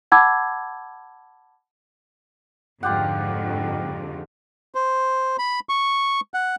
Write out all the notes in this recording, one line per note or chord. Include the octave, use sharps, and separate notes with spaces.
F#5 A5 B5 D6 E6 G#6
F2 G#2 D3 F4 G4 F#5
C5
B5
C#6
F#5